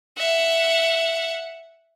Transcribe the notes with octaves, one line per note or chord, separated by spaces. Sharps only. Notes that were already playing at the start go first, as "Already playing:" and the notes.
E5 F#5